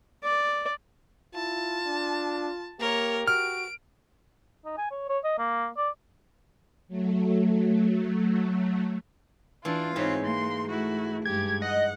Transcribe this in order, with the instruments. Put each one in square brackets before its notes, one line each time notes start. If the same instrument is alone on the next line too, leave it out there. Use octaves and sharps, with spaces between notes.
[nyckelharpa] D5
[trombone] E4 [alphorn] F4 [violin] A5
[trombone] D4
[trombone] A#3 [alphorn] G4 [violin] A#4 C#5
[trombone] F#4 [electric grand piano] F6 [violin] D7
[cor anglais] D#4
G#5
C#5
C#5
D#5
A#3
D5
[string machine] F#3 A3
[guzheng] E3 [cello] D4 [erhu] F4
[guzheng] G#2 B4 [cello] C4 C#5
[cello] A#3 [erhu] C6
[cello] A3 E4 [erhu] F#4
[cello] G2 G#3 [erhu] G4 [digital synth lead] G#6
[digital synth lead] D#5 [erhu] F#5